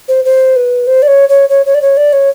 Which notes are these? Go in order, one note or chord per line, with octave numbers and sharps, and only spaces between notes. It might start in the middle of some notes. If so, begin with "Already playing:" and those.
C5
C5
B4
C5
D5
C#5
C#5
C#5
C#5
D5
C#5
D5
C#5